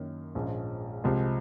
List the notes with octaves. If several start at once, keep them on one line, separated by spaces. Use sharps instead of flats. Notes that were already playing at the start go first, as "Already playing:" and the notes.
Already playing: F#2 D#3 A#3
A#1 G#2 F3 G#3 C#4
C2 C3 F3 G#3